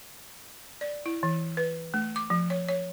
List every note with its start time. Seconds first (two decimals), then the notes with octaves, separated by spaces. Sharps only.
0.81 D5
1.06 E4
1.23 E3
1.57 B4
1.94 A3
2.16 D6
2.30 F3
2.50 C#5
2.69 C#5